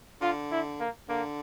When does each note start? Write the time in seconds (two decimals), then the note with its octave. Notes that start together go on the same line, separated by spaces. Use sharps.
0.21 D3 F4
0.51 E4
0.80 A#3
1.09 D3 A#3